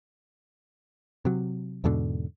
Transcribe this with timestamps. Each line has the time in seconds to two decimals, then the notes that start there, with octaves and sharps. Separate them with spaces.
1.25 C3 F#3
1.84 E2 G#2 B2 D3